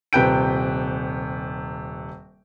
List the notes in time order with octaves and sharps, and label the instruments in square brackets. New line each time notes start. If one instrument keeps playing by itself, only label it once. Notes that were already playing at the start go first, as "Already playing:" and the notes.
[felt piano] D#1 C3 B4 G5 G6 D7